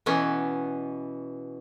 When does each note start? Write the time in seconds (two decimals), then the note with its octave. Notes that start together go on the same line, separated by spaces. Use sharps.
0.06 B2 E3 B3 C#4